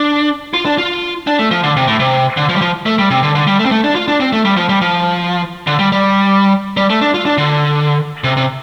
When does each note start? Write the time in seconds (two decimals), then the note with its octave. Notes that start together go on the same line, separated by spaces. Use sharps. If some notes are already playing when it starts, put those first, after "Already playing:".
Already playing: D4
0.54 F4
0.65 D4
0.78 F4
1.27 D4
1.39 A3
1.51 F3
1.64 D3
1.76 C3
1.87 A2
2.00 C3
2.37 D3
2.49 F3
2.56 G3
2.61 F3
2.86 A3
2.99 G3
3.11 C3
3.23 D3
3.35 D3
3.47 G3
3.59 A3
3.65 C4
3.71 A3
3.84 D4
3.95 F4
4.08 D4
4.20 C4
4.33 A3
4.45 G3
4.57 F3
4.69 G3
4.81 F3
5.67 D3
5.79 G3
5.92 G3
6.77 G3
6.90 A3
7.02 D4
7.14 F4
7.25 D4
7.38 D3
8.24 C3
8.37 C3